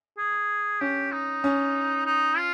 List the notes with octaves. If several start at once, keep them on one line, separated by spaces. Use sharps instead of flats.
G#4
C#4 G4
D#4
C#4
D#4
F4